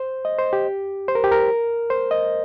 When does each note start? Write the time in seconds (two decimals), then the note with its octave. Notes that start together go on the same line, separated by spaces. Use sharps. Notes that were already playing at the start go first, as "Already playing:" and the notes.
Already playing: C5
0.25 D#5
0.39 C5
0.53 G4
1.08 C5
1.15 A#4
1.24 G4
1.31 A#4
1.90 C5
2.11 D#5